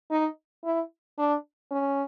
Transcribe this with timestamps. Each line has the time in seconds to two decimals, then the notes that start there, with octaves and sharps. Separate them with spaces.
0.11 D#4
0.65 E4
1.18 D4
1.71 C#4